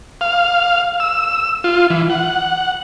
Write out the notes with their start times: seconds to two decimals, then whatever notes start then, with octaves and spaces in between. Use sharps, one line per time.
0.21 F5
1.00 E6
1.64 F4
1.90 E3
2.10 F#5